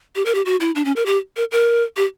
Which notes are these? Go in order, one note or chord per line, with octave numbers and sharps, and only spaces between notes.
G4
A#4
G4
F#4
E4
D4
C#4
A#4
G4
A#4
A#4
G4